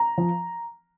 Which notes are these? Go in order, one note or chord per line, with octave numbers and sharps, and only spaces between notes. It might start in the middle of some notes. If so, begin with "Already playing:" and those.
Already playing: A#5
F3